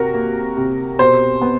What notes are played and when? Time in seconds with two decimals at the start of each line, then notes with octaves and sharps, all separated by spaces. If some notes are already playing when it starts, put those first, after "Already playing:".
Already playing: C3 F#4 A#4
0.14 A#3
0.57 C3
0.99 B2 C5
1.42 B3